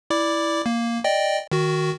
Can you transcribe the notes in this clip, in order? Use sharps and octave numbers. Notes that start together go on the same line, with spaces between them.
E4 D5 D6
A#3
D5 D#5 G5
D#3 F#4